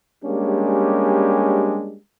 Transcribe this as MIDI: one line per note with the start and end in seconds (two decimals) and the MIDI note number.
0.24 1.96 55
0.24 1.96 56
0.24 1.96 58
0.24 1.96 61
0.24 1.96 62
0.24 1.96 67